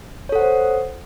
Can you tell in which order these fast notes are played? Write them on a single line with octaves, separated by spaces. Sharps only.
C#5 A4 F#5 C5